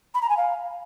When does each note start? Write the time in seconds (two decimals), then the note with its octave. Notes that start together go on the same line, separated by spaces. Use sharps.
0.14 B5
0.21 A#5
0.29 G#5
0.37 F5